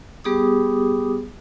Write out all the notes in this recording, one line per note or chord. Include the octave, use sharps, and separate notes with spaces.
G3 B3 G4 G#4 D6 D#6